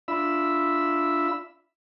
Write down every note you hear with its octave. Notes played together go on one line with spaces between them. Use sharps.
D4 F4 E5 B5 E6